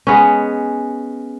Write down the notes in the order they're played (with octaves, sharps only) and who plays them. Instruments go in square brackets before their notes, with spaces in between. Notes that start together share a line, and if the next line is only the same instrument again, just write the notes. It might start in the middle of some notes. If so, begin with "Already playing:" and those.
[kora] G#3 B3 C#4